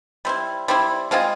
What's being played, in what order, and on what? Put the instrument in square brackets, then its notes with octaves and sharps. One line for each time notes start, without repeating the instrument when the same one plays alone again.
[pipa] G3 C4 E4
G3 C4 E4
G#3 C4 F4 G#4